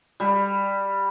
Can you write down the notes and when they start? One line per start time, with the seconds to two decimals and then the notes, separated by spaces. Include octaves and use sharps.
0.20 G3